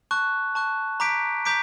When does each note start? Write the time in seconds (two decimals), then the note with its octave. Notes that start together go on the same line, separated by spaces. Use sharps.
0.11 A5 C#6 F#6
0.55 A5 C#6 F#6
1.00 A#5 D6 G6 B6 D7
1.45 A#5 D6 G6 B6 D7